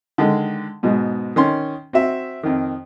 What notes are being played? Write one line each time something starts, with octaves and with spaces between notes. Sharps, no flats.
D3 D#3 G#3
G#2 B2 G#3
D#3 C#4 C6
C4 F#4 E5
F2 D#3